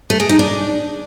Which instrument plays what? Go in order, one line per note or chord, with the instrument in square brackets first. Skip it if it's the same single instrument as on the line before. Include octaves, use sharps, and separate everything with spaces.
[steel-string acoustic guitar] A3
G#3
D#4
D4